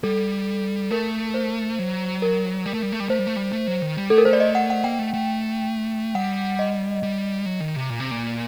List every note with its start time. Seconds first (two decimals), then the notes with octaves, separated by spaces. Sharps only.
0.03 G3 A4
0.91 A3 A#4
1.34 C5
1.79 F#3
2.22 A#4
2.66 G3
2.74 A3
2.83 G3
2.92 A3
3.00 G3
3.09 A3 C5
3.19 G3
3.27 A3
3.36 G3
3.52 A3
3.67 F#3
3.82 D#3
3.97 G3
4.10 A3 A4
4.18 A#4
4.25 A3 C5
4.33 D5
4.40 D#5
4.55 F#5
4.70 F#5
4.84 A#3 G5
4.99 A3
5.14 A3
6.15 G3 F#5
6.59 D#5
7.03 G3
7.46 F#3
7.60 D#3
7.76 C3
7.90 A#2
8.00 C3
8.11 A#2